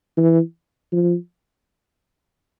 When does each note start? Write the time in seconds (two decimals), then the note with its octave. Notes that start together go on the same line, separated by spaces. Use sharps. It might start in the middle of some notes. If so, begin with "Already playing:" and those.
0.17 E3
0.92 F3